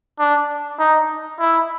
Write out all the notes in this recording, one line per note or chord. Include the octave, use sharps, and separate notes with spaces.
D4
D#4
E4